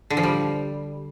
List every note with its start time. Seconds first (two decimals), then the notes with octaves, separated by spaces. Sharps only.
0.10 D3
0.17 F3
0.23 G3